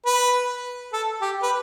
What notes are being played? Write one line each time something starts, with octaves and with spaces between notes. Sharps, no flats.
B4
A4
G4
B4